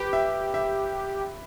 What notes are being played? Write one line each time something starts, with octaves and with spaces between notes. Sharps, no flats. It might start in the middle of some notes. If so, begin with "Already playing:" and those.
Already playing: G4 B4
E5
E5